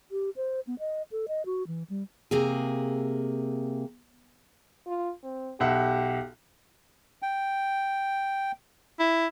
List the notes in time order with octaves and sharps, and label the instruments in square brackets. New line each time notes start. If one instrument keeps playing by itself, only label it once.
[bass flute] G4
C5
B3
D#5
A4
D#5
F#4
E3
G3
[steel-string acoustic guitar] C3 A#3 G#4
[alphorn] F4
C4
[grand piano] B1 E5 F#5 [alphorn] G4
[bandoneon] G5
[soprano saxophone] E4